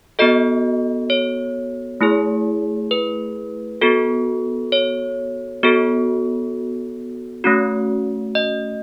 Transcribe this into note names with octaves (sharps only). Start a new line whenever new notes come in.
B3 F#4 A4 D#5
C#5
A3 E4 G#4
B4
B3 F#4 A4
C#5
B3 F#4 A4
A3 C#4 F#4
D#5